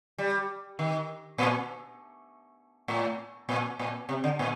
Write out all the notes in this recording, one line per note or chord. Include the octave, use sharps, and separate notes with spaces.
G3
D#3
A#2
A2
A#2
A#2
C3
D3
A#2